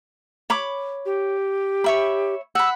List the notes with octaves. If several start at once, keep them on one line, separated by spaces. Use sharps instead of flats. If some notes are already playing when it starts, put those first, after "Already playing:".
C#5 B5 D6
G4
C#5 E5 B5
F#5 B5 E6